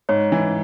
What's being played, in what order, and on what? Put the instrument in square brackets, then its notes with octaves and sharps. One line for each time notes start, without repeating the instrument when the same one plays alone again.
[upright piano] G#2 [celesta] C#5
[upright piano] E3